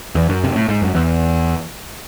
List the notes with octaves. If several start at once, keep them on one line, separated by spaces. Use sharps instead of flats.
E2
F#2
C3
A2
G#2
F#2
E2